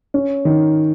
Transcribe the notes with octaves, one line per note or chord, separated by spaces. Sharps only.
C#4
D#3